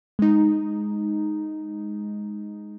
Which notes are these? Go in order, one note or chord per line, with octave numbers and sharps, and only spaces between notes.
G#3 D#4